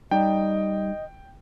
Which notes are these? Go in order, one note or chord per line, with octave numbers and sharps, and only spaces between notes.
G3 D#4 D5 D#5 G5